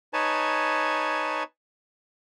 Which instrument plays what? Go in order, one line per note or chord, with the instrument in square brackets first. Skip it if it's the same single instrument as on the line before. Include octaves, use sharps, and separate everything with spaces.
[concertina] D#4 B4 C#5 G#5 A5